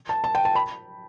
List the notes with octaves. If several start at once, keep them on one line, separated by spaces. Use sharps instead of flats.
A5
A5
G5
A5
B5